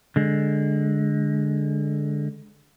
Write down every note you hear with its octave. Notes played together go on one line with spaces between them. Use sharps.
D3 G#3